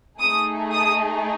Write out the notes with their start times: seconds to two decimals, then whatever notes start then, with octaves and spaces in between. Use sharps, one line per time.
0.19 A3 D#4 G#4 D#6
0.72 D#6